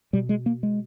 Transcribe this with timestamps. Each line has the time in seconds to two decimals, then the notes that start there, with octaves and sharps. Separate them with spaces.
0.13 B2 G3
0.29 G#3
0.46 A#3
0.63 G#3